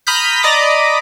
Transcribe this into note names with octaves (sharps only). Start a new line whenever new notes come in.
A#5 B5 D#6 F6 G6 B6
D5 D#5 A#5 B5 D6 D#6